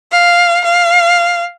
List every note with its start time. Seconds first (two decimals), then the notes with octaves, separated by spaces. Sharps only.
0.12 F5
0.65 F5